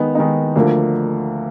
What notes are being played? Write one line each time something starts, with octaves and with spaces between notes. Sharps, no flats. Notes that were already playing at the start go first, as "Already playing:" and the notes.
Already playing: D#3 G#3 B3 D#4
D#3 G#3 B3 D#4
D2 D3 F3 A#3